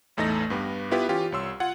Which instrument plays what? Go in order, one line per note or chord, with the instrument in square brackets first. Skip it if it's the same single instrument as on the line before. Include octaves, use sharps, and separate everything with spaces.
[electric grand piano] A1 E2 A3 D#4 A#6
G2 B3 G4
B3 E4 F4 G4 B4
E3 C#4 F4 G4
C2 C#5 C6 E6
F4 F#5 G#6